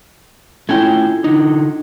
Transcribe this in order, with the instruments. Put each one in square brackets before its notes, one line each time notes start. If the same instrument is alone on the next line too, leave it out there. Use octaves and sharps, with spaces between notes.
[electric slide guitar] A3 C#4 G5 [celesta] E4 F4 G#6
[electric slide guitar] D3 D#4